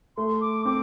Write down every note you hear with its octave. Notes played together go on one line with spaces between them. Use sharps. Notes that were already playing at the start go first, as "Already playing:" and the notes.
A3 C6
D6
C4 D6